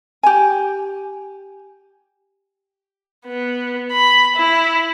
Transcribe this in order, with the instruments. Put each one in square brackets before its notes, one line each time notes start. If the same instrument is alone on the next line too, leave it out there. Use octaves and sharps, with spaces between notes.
[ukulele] G4 G#5
[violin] B3
B5
E4